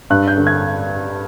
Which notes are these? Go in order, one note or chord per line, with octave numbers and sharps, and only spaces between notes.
G2 F#6
G6
D3
G#6